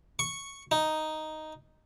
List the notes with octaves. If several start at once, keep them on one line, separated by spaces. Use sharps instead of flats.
C#6
D#4